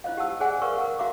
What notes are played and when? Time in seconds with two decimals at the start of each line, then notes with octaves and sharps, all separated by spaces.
0.04 E4 F4 C5 D#5 F5
0.17 G4 F#5 A5 E6
0.40 G#4 C5 D5 E5 F#5 G#5
0.62 A#4 B4 D5 F5 C#6
0.78 A#4 F#5
0.99 F#4 E5 F5 A#5 D6